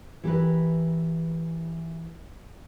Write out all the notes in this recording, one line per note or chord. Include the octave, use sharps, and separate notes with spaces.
E3 G4 A#4 B4